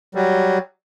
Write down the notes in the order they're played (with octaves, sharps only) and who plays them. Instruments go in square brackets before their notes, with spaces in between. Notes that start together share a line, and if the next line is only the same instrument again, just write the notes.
[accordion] F#3 G3